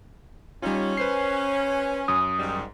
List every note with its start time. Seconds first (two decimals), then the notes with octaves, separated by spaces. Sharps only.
0.62 G3 C#4 D#4 F4
0.97 B4 C5 C7
2.08 F#2 D#6
2.39 G#2 D#3 G3